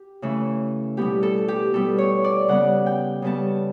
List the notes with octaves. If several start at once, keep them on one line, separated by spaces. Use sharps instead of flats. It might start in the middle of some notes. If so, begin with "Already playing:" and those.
Already playing: G4
C#3 E3 A3
B2 G3 B3 G4
A4
G4
B2 G3 B3 A4
C#5
D5
C#3 G3 B3 F#5
G5
C#3 G3 B3 A5